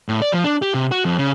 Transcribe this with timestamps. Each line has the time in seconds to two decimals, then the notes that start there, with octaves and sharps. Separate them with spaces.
0.09 A2
0.22 D5
0.33 F3
0.44 D4
0.62 G4
0.74 C3
0.91 F#4
1.05 F2
1.18 C#3